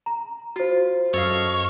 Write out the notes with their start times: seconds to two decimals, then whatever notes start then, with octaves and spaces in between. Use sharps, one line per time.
0.06 A#5
0.56 F4 F#4 C5
1.14 F#2 A4 C#5 D#5 F5